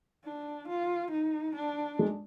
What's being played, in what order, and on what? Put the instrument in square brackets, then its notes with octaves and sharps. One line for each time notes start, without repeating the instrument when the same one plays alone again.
[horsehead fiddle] D4
F4
D#4
D4
[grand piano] G#3